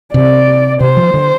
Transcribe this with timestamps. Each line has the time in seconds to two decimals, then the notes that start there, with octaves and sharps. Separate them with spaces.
0.14 C3 D5
0.80 C3 C5
0.97 F3
1.14 D3